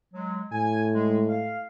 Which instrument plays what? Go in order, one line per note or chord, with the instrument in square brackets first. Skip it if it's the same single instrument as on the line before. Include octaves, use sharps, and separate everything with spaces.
[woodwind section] F#3 G#3
[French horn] A2 [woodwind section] G#5
[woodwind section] G#3
F5